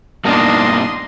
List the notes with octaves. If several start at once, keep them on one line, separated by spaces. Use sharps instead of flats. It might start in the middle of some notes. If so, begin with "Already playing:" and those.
G2 B2 A#3 D4 D#4 D#5 C6